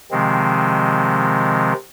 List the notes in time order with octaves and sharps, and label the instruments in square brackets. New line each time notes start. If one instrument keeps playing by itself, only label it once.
[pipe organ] C3 D#3 F3 G#3 C4